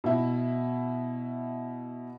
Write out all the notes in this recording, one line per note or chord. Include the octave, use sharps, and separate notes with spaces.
B2 E4